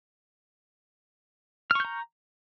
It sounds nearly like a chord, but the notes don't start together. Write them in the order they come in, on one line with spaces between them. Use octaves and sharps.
F6 C#6 G6 A#5